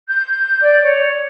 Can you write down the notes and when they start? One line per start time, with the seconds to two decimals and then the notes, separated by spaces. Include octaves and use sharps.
0.08 G6
0.61 D5
0.83 C#5